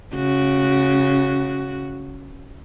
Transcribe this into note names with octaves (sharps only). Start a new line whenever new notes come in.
C#3 F#4